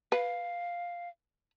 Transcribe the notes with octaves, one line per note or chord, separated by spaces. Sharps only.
B4 F5